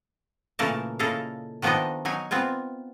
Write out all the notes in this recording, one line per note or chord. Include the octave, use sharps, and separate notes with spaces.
A#2 C#3 E3 A3 A#4 A5
A#2 C#3 E4 A4 D#5 F5
D#3 F3 B3 D4 D#4 D#5
F#3 D#4 G#5
B3 C4 F4 G#5